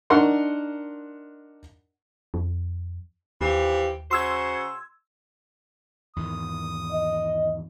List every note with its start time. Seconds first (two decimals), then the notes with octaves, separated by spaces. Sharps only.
0.10 D4 D#4 A#4 F#5 C6 C#6
2.34 F2
3.41 D#2 E3 F3 G4
4.11 C#3 F#4 C5 C6 E6 G#6
6.16 E2 G#2 D#3 D#6
6.91 D#5